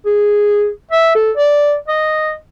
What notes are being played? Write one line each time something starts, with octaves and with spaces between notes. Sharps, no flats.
G#4
E5
A4
D5
D#5